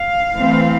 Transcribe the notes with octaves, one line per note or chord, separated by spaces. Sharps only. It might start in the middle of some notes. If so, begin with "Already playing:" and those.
Already playing: F5
E3 A3 C4